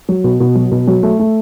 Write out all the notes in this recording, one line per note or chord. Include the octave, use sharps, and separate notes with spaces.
F#3
B2
B2
F#3
B2
F#3
A3
A3